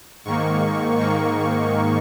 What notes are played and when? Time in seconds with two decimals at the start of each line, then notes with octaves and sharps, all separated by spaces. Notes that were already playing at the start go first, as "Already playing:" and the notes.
0.25 G#2 D#3 A#3 C#6
0.98 G#2 D#3 A#3 C#6